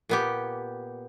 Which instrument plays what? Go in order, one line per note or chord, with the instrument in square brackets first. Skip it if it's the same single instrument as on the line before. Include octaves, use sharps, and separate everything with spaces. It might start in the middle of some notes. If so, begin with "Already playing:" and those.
[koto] A#2 B3 G4